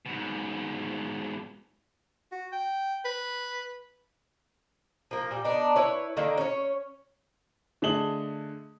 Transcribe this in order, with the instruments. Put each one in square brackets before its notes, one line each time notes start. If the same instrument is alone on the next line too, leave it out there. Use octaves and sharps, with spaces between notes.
[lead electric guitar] G#2 B2
[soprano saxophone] F#4
G5
B4
[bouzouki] F3 A#3
A#2 G3
B3 D4 D#4
E4 B4 C#5
D3 D#3 A#3
C#4 C#5
[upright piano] D3 A3 G#4 D#5 F#7 G7